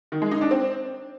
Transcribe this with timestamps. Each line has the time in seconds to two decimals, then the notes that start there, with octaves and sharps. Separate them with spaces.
0.12 D#3
0.22 G#3
0.31 D#4
0.41 D4
0.51 C4